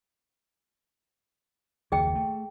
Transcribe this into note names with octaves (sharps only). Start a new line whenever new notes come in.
F#1 D#2 A#3 G#4 D#5 G5
A3